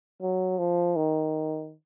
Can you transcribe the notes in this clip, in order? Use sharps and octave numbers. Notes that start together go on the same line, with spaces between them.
F#3
F3
D#3